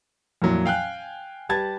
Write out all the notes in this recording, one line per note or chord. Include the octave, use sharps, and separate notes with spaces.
F2 A#2 E3 F#3
F5 G5 G#5 F#6
G3 G4 B4 A5 G#6 A6